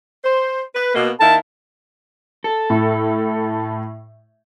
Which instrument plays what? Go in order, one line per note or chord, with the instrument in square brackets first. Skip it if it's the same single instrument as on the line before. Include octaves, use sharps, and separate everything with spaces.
[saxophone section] C5
B4
B2 A#3
[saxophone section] D#3 A#3 E4 [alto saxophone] A5
[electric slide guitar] A4
[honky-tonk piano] A2